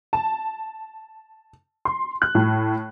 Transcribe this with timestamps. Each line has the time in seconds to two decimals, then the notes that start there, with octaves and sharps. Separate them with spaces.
0.13 A5
1.85 C6
2.22 F#6
2.35 A2